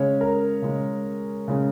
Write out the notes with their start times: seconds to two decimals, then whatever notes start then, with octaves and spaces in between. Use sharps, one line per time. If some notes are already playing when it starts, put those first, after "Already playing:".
Already playing: C#3 G#3 C#4 C#5
0.21 A#4
0.62 C#3 G#3 C#4
1.48 C#3 G#3 C#4